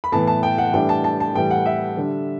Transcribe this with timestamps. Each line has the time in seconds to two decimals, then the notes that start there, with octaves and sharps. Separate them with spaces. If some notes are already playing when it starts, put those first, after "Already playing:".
0.04 B5
0.12 A2 E3 B3 A5
0.27 A5
0.43 G5
0.58 F#5
0.73 A2 E3 G3 D4 G5
0.89 A5
1.04 A5
1.20 A5
1.35 A2 E3 G3 G5
1.51 F#5
1.66 E5
1.97 D3 G3 D4